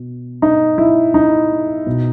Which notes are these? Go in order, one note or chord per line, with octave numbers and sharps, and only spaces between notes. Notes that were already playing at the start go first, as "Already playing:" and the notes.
Already playing: B2
D#4
E4
D#4
B2